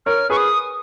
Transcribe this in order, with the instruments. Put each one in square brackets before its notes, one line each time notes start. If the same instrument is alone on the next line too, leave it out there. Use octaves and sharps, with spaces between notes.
[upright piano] A#4 C#5 [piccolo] F6
[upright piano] G#4 B4 [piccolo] C#6
[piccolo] D#6